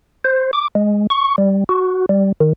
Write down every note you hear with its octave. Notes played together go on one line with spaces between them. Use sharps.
C5
D6
G#3
C#6
G3
F#4
G3
D#3